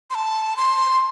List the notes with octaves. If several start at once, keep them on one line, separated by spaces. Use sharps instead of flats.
C6
A5
C6